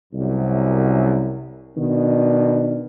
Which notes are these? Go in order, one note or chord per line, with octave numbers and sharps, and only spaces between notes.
C2 F#2
B2 D#3 B3 D4